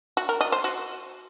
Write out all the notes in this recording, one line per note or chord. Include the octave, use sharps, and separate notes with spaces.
F#4
A#4
D#5
C5
F#4